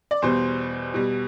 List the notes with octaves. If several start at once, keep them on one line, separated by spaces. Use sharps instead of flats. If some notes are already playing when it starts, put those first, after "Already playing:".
D5
E2 B2 G3 C5
B2 G3